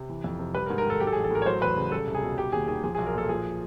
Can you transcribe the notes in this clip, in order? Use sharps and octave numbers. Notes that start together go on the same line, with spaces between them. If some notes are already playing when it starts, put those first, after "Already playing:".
Already playing: C3
E3
F2
C3
G3 B4
A#4
G#2
A#4
D#3 A4
F#3 G4
A4
G#4
A1
A4
A2 A#4
C#5
F#3 C5
E2 B4
C#3
G3 A4
C2
G#4
B2
G3 G4
D#2 G#4
D#3 G#4
F3 G#4
G#4
B1
A#4
A#2 A4
F3 G#4